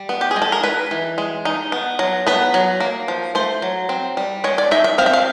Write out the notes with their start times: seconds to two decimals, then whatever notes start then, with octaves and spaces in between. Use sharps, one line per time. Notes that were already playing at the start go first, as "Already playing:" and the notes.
Already playing: G3
0.09 B3
0.21 G4
0.31 G#4
0.36 G#3
0.42 A4
0.52 A#4
0.63 G#3 B4
0.91 E3
1.18 G#3
1.45 D#4
1.72 B3
1.99 F#3
2.27 B3 B4
2.54 F#3
2.80 A#3
3.08 F3
3.35 A3 C5
3.62 F#3
3.89 C4
4.17 G3
4.44 G#3 C#5
4.58 D5
4.71 D#4 E5
4.84 E5
4.98 C4 F5
5.06 E5
5.13 F5